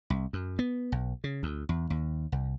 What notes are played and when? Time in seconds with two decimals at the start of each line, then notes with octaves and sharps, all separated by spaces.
0.10 C2
0.33 F#2
0.59 B3
0.92 B1
1.24 C#3
1.43 D2
1.69 E2
1.90 D#2
2.32 C2